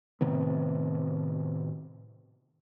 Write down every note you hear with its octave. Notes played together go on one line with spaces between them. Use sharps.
A2 C3 D#3 B3